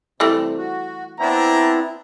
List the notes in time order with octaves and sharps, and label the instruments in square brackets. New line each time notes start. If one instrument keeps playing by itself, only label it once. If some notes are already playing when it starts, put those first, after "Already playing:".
[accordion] C3 [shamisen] E3 G3 A3
[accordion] F#4
[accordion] B3 C4 E4 [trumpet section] D4 G5 A#5